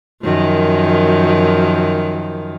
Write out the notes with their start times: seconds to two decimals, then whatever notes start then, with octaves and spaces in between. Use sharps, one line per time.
0.23 F#2 D#3 F3